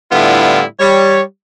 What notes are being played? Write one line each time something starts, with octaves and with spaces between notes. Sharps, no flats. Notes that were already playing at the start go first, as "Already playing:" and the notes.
A2 D3 G3 B3 E4 F4
G3 C#5